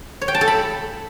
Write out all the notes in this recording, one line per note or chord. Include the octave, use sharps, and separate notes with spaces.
C#5
G5
A5
A4
B5